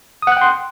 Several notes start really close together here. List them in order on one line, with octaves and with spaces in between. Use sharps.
D#6 F#5 F#6 G5 C6